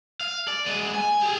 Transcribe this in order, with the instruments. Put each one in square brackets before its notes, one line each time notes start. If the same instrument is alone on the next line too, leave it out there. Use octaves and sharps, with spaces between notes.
[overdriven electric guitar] F5
D5
G#3 B3
G#5
G4 G#4